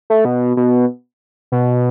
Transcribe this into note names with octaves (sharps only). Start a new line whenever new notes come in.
A3
B2
B2
B2